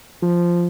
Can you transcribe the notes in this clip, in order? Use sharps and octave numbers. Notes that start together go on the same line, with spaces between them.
F3